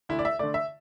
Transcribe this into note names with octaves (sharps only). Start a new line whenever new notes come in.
D2 E4
D5
E5
D3 A3 D5
E5